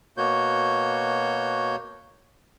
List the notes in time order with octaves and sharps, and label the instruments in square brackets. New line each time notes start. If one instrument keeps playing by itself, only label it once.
[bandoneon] B2 A#3 F#4 C#5 G6